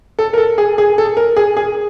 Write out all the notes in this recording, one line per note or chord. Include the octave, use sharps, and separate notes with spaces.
A4
A#4
A4
G#4
G#4
A4
A#4
G#4
G#4